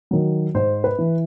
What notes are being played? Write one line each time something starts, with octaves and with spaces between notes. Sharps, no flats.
D#3 F#3
G#2 C5
B4
E3